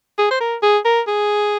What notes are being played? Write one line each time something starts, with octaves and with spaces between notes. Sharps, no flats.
G#4
C5
A#4
G#4
A#4
G#4